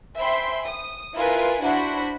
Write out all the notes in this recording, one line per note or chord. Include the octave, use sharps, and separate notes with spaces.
C5 E5 G5 G#5 B5 C6
D#6
E4 F4 A#4 B4 F5 G#5
D4 E4 F#4 C5 F#5 B5